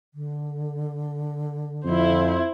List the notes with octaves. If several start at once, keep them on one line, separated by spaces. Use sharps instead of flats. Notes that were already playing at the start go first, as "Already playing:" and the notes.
D3
F2 E4 C5